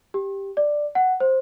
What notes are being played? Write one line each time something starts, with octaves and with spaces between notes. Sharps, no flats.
G4
D5
F#5
C5